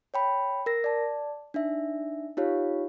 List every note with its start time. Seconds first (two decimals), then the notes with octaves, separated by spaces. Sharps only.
0.14 C#5 G5 B5
0.66 A#4 A#6
0.84 D5 A5
1.54 D4 D#4 E5
2.37 D#4 F4 G4 C#5 F5